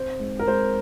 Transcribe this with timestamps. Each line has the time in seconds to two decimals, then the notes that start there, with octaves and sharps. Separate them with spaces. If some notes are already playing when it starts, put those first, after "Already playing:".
Already playing: C4 C5
0.20 G#2
0.39 A#4
0.47 G#2 C5